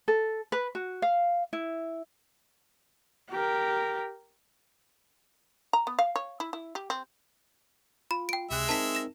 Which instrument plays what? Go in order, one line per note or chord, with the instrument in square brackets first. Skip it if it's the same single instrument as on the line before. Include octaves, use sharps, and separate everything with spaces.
[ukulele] A4
B4
F#4
F5
E4
[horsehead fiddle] G4 A#4
[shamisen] A#5
B3
F5
C#5
E4
E4
G4
C4
[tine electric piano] F4 [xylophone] B5
[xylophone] G5 D7
[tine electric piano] C#2 C3 F#6 [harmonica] G#3 E5
[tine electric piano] C4 D#4 A#4 [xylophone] A5 B6
[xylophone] A#6 E7